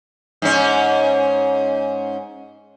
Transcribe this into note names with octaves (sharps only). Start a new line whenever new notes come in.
G#2 C#4